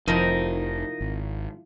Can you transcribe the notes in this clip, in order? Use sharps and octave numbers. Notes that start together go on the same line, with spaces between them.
F1 F3 D#4 E4 A#4
G#1